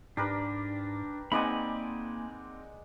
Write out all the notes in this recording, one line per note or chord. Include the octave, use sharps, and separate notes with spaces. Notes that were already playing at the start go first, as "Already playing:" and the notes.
G#2 D4 G4 A#4 B4
G#3 A#3 C4 D#4 D5 F#5 G#5 B5